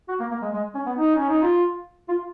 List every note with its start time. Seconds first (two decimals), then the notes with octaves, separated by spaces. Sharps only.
0.08 F#4
0.20 A#3
0.31 A#3
0.42 G#3
0.54 G#3
0.75 C#4
0.86 B3
0.98 D#4
1.16 C#4
1.29 D#4
1.42 F4
2.09 F4